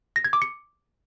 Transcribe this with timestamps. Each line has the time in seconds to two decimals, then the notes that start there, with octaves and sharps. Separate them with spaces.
0.16 A#6
0.24 G#6
0.33 D6
0.42 C#7